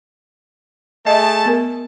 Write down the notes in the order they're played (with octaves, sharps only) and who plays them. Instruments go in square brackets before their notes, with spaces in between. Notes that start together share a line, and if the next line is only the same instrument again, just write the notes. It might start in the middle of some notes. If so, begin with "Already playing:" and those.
[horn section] A3 G#4 A5 [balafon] D#5 E5
[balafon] B3 A#4